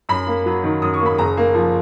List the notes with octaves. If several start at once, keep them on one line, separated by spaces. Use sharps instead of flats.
F#2 B5
A#3
F#3
D#3
F#2 D#6
C#6
A#3
B5
F#1 A#5
A#3
F3